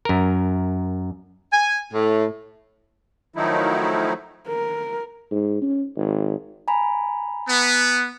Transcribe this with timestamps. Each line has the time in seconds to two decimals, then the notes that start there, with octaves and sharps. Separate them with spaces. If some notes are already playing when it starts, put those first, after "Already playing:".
0.05 F#2 A#4
1.52 G#5
1.94 A2
3.36 D#3 F3 F#3 A3 D#4 E4
4.48 A#4
5.31 G#2
5.62 C#4
5.97 G#1
6.68 G#5 A#5 B5
7.48 B3